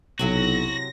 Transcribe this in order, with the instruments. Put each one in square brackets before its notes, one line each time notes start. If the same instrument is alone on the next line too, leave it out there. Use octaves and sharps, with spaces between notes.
[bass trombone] B1 [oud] C3 F#3 E4 [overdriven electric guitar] F#4 [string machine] A#6